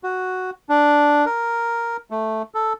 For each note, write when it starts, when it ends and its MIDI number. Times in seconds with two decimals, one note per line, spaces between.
0.04 0.50 66
0.69 1.25 62
1.26 1.97 70
2.11 2.42 57
2.55 2.73 69